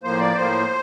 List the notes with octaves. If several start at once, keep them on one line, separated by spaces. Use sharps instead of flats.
A2 F3 A#3 C5
D5
A2 F3 A#3 C5